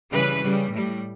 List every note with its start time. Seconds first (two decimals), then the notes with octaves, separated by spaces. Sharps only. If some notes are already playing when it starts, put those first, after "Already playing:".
0.12 C#3 E3 G3 B4
0.43 C#3 G3
0.74 A2 G3